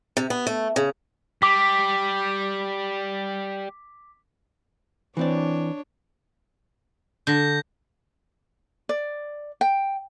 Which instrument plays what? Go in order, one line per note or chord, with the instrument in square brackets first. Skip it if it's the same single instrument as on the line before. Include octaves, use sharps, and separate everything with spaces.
[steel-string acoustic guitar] C3
B3
A3
C#3
[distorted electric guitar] G3 [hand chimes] D6 B6
[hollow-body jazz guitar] E3 C4 D5 [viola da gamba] D4 C#5
[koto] D3 [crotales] G6 A#6
[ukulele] D5
G5